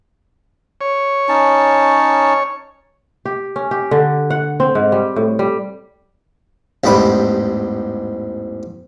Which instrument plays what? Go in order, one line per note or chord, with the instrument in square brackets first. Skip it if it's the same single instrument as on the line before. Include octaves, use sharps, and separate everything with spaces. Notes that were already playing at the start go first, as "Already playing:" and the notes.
[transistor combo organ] C#5
[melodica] C#4 D#4 A5
[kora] G4
C#4
G4
D3
F#5
C4
G#2
G3
A2
G3
[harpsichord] A1 E2 G#2 G3 B5